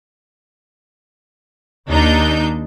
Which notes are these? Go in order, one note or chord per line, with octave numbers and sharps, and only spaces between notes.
D#2 D4 D#4 G6